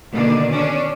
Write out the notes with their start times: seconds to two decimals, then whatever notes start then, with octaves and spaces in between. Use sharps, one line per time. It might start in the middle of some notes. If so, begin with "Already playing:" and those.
0.12 B2 D3 D#3 A#3 D4
0.51 C#4 D4